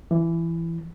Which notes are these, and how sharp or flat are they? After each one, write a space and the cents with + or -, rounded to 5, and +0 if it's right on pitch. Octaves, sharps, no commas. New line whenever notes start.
E3 +15